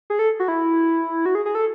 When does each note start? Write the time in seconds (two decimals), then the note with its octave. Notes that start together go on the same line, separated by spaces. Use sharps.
0.10 G#4
0.19 A4
0.40 F#4
0.48 E4
1.26 F#4
1.35 G#4
1.46 G#4
1.55 A4